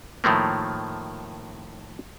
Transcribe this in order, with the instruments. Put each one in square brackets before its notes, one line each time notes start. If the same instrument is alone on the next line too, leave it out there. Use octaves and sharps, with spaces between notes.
[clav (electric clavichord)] A2 D#3 F3 A3 A#3